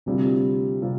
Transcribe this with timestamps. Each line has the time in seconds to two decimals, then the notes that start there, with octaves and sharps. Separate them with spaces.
0.06 D2 C3 G3 C4 F4
0.82 C3 G3 C4 F4